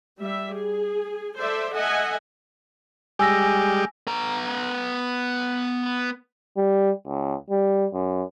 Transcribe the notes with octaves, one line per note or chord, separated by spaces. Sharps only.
G3 E5
G#4
A4 C5 D5 E5
A4 D#5 E5 F#5 G#5
G3 G#3 G4 G#5 E6 A#6
B3 A#5
G3
C#2
G3
F#2